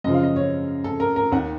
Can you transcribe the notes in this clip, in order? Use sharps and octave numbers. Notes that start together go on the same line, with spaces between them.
F#2 C#3 F3 D#5
F5
D#5
C#5
A4
A#4
A#4
D#2 D#3 F#5